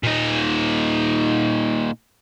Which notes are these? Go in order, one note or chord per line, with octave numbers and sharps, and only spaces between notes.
A#2 D#4